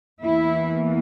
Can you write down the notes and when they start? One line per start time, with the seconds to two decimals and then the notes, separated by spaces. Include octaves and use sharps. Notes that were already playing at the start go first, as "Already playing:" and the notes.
0.23 E2 E3 A#3 E4